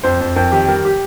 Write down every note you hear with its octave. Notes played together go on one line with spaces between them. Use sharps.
F2 C5
F2
F2 A#4
D#3 G4
G3 A#4
G4